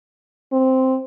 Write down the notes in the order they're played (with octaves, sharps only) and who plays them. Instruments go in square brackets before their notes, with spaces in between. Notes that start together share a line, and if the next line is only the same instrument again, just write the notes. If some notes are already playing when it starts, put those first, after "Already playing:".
[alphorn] C4